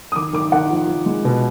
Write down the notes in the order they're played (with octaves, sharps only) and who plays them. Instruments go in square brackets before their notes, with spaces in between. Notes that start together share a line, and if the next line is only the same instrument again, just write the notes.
[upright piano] D#6
[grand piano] D#3 [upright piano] D6
[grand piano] D#3 [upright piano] D6
[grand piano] D#3 [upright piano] F#5
[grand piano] F3
F3
G#3
B2